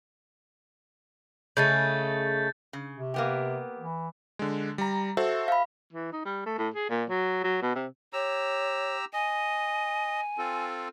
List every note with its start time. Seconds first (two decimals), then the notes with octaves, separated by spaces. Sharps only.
1.57 C#3 A3 D#5 G6 A6
2.73 C#3
2.93 C3
3.14 A#3 B3 G4
3.78 E3
4.39 D3 G#3
4.78 G3 A#5
5.17 F#4 A4 C5 E5
5.48 F5 B5
5.93 E3
6.12 D#4
6.25 G3
6.46 A3
6.58 A2
6.74 G#4
6.89 A#2
7.09 F#3
7.44 F#3
7.62 B2
7.75 C3
8.13 G4 C#5 A#5 E6
9.13 D#5 G#5
10.38 C4 F4 A4